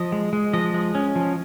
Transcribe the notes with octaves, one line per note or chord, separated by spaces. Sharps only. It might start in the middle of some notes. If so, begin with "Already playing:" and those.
Already playing: F3 D#5
G#3
G#3
F3 D#5
G#3
C#4
F3